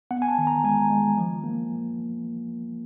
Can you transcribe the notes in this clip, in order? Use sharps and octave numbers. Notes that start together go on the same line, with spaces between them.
B3 F#5
G#5
A5
D#3
A#5
G#3 G#5
G#3
F3
A#3